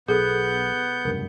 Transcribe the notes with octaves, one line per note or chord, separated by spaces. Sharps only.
B1 B3 G#4 A4 F#5 G6
F1 C#2 G2 A#4